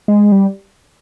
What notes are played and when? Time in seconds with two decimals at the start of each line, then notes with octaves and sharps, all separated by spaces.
0.08 G#3
0.32 G3